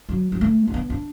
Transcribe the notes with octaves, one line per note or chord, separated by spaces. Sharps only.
F#3
F#3
A3
D4
B3
D4